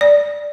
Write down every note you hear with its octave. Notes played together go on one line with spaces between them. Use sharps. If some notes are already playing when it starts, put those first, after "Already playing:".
D5